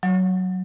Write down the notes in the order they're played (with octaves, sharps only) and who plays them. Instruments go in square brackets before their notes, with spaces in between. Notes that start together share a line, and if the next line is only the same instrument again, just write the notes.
[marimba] F#3